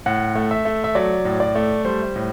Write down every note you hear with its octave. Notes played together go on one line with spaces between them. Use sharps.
A2 F#5
A3
E5
A3
E5
F#3 D5
A2
D5
A3
G3 C5
A2